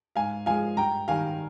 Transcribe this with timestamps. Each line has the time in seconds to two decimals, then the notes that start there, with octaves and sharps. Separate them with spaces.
0.16 G#2 F5 G#5
0.46 F3 G#3 F5 G#5
0.77 G2 G5 A#5
1.08 D#3 G3 F5 G#5